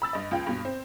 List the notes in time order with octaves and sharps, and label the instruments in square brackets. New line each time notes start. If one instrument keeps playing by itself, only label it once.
[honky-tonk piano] B5 E6 A6
G2 D#5
C#2 F4 F5 G5
G2 B2
C4